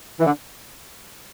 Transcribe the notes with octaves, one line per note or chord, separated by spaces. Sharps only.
E3
D3